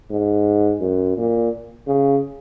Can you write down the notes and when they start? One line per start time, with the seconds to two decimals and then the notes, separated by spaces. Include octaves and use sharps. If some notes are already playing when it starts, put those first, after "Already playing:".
0.11 G#2
0.81 F#2
1.17 A#2
1.87 C#3